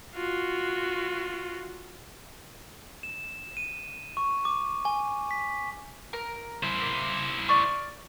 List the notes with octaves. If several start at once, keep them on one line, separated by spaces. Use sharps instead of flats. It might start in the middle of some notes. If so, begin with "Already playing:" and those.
F4 F#4
E7
D#7
C#6
D6
G#5
B6
A#4
E4 C5
A#3
D5 C#6 F6